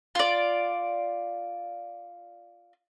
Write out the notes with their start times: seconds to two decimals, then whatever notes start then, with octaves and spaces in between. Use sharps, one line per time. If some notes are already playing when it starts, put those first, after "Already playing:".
0.15 F4 D5